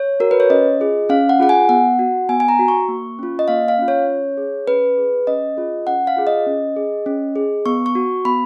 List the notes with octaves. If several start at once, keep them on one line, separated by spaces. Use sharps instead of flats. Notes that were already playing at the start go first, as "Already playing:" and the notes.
Already playing: C#5
F#4 A#4
B4
C#5
C#4 D#5
F4 G#4
C#4 F5
F#5
F4 G#4 F#5
G#5
B3 F#5
F#4
B3 G#5
G#5
A#5
F#4
C#6
A#3
C#4 F4
D#5
A#3 F5
F5
C#4 F4
C#5
C#4
G#4
C#4 B4
G#4
C#4 D#5
F4 G#4
C#4 F#5
F5
F4 G#4
D#5
C#4
G#4
C#4
G#4
B3 C#6
C#6
F#4
B3 B5